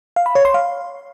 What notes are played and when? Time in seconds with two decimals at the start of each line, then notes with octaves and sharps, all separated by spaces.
0.16 F5
0.26 B5
0.35 C#5
0.45 C6
0.54 F5